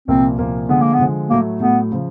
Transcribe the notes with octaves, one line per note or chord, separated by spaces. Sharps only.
C2 A#2 F3 A#3 C4
C2 A#2 F3 A#3
D3 F3 G#3 B3
A#3
B3
D3 F3 G#3
A2 F#3 A3 A#3
A2 F#3 A3 B3
C#3 F3